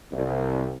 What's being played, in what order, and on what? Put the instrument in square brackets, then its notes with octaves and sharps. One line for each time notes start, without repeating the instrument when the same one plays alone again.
[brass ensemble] C2